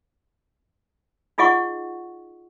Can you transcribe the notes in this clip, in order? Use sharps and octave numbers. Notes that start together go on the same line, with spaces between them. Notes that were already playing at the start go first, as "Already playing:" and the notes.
D#4 F4 G#4 D#5 F#5 C#6